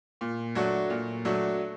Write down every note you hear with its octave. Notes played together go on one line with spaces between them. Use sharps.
A#2
F#3 A3 D4 F#4
A#2
F#3 A3 D4 F#4